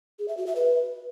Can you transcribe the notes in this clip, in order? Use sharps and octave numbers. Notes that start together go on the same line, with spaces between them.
G#4
E5
F#4
E5
B4